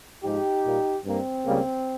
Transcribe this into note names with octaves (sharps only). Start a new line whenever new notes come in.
G#2 F3 G#3 D#4 G4
A#2 G3 A#3
G2 G3 A#3 C4
C#2 C#3 G3 A#3